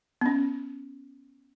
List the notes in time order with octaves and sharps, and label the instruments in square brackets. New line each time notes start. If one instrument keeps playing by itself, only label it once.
[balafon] B3 C#4